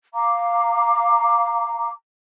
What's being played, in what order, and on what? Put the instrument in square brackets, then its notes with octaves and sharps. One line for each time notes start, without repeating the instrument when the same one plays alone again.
[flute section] F5 A#5 D6